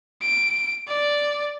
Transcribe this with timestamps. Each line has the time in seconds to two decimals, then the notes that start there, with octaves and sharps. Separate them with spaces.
0.21 D7
0.88 D5